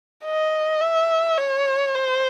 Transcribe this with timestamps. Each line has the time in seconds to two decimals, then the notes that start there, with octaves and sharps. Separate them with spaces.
0.25 D#5
0.81 E5
1.38 C#5
1.95 C5